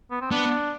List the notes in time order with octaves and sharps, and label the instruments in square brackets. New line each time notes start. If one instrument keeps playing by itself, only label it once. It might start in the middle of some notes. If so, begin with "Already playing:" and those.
[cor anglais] B3
C4
[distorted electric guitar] B3 [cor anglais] D4